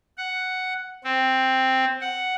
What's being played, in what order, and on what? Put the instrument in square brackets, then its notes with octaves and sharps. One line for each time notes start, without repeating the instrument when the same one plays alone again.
[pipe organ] F#5
C4
F#5